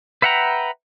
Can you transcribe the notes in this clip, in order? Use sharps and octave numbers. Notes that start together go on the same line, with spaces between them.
B4 E5 F#5 G5 A#5